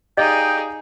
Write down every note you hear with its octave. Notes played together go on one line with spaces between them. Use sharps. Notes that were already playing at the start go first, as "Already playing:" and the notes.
D#4 G4 G#4 D5 D#5 F5 G5